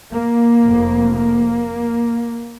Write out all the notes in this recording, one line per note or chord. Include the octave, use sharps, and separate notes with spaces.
A#3
F1 F2
A#3